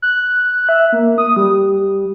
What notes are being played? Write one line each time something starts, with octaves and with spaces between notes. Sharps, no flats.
F#6
E5
A#3
D#6
G3